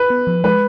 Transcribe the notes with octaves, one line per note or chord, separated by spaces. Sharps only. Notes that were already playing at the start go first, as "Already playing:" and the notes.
Already playing: B4
B3
F3
G#3 B4